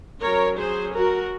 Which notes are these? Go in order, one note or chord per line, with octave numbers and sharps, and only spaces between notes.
F#3 C#4 A#4 C#5
G#4 C5
F#4 A#4